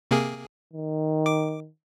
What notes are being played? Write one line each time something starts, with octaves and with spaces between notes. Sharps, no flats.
C3 A#3 G#4
D#3
D6